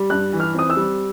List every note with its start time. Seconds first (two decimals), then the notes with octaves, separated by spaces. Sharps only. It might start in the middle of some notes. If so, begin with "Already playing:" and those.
Already playing: G3
0.10 G2 F#6
0.33 E3
0.40 F6
0.54 C4 D#6
0.70 E6
0.77 G3